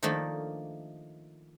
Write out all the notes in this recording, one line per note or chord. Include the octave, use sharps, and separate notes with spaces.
D#3 F3 A3 A#3 D4